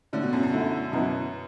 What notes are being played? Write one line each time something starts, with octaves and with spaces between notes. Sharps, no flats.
A2 D3 E3 A3
B2
F#2
F#2
D3 A3 E4
F#2 B2 F#3 B3 E4